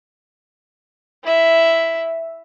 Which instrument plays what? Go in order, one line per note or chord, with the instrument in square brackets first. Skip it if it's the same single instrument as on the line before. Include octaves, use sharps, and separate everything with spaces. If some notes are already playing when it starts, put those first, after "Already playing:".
[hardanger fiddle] E4 E5